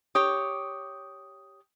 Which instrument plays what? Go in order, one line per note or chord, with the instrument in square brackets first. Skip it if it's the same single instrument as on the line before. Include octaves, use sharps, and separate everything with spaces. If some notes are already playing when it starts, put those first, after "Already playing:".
[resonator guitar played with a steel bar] G4 C#5 [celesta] D#6